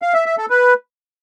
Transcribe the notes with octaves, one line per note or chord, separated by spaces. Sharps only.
F5
E5
E5
A4
B4